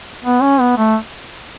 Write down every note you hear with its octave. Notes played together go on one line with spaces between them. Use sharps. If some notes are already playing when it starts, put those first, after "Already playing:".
B3
C#4
B3
A3